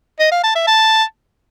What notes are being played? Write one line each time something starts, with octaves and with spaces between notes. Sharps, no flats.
D#5
F5
A5
E5
A5